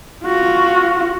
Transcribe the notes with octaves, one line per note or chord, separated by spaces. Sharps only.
F4 F#4